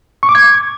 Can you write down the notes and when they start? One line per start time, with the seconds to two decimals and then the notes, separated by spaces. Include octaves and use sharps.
0.23 C#6
0.29 D6
0.35 G#6